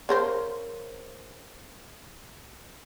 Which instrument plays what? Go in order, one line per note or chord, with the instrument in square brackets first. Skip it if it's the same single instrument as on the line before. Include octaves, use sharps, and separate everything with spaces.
[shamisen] C#3 A#4 C5